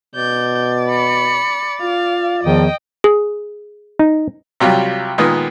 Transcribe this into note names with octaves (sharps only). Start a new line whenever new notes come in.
B2 D5 G6
B5 C#7
F4 F5
E2 D#3 F3 D#5 G5
G#4
D#4
C3 F#3 G3 F4
A#2 D#3 G#3 B3